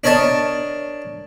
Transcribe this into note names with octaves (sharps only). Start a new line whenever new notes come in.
D4 A#4 C#5 D#5 A5